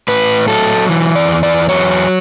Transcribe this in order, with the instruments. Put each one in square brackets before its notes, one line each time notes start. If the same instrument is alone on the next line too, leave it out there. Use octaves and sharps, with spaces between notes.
[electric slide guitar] A2 B4
F#3 A4
E3
D5
E2
D5
F#3 C#5